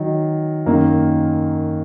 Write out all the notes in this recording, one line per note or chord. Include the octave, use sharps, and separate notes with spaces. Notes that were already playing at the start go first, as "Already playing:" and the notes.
Already playing: D#3 F#3
F#2 D#3 A#3